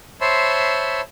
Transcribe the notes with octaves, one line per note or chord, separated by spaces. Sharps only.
C5 C#5 E5 A5 B5 C6